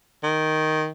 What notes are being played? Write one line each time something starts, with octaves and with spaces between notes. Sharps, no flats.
D#3